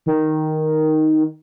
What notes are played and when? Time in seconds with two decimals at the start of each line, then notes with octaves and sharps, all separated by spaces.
0.06 D#3